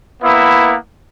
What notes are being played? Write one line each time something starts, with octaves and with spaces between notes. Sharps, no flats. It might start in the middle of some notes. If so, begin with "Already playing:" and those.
A#3 B3 E4 E5